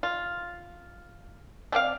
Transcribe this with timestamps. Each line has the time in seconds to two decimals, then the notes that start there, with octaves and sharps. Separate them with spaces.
0.03 F4
1.72 A3 C4 D5 F5